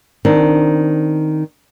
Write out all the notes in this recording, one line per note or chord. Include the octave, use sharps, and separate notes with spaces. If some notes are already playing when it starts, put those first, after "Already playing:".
D#3 C4 D4